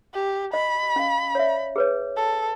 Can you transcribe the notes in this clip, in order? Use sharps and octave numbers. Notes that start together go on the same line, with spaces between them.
G4
D#5 B5
C#4 F5
C#5 D5 E5
G#4 B4 C#5
A4